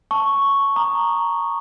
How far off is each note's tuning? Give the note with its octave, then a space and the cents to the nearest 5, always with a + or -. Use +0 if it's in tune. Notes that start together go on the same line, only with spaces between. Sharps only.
A5 +0 C#6 +0
A#5 +0 D#6 -30